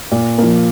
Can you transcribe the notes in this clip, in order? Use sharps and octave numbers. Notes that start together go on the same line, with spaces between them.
A#2
F3 A#3